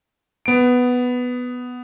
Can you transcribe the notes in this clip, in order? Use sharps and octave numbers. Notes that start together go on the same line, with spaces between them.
B3 D7